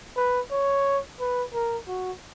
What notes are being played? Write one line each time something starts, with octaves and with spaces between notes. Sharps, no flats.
B4
C#5
B4
A#4
F#4